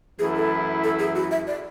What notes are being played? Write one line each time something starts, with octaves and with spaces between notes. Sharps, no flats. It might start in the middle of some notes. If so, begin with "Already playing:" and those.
F#2 E3 A3 E4 G#4
A4
A4
G#4
F#4
E5
D5